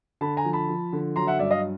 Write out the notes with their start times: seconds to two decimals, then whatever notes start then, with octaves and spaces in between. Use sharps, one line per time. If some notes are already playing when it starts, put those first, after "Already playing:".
0.21 D3 A5 B5
0.37 G#5 A#5
0.45 F3
0.53 A5 B5
0.69 F3
0.93 D3
1.16 F#3 A#5 C6
1.27 E5 F#5
1.39 G2 D5 E5
1.51 D#5 F5